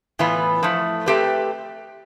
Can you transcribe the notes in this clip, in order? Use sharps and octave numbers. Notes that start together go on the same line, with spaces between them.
A2 E3 B3 F4 B4
F3 A3 E4
A3 C4 G4 B4